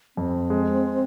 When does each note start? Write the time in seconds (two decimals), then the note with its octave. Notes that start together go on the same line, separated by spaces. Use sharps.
0.17 F2 C4
0.50 G#3